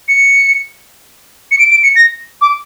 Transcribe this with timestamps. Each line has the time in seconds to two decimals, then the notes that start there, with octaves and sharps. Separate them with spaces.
0.08 C#7
1.51 C#7
1.59 D7
1.71 D7
1.83 C#7
1.96 A#6
2.41 D6